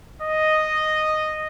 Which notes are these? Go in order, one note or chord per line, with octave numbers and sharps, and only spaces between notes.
D#5